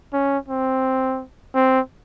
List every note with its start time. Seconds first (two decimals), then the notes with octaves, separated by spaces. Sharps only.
0.13 C#4
0.48 C4
1.55 C4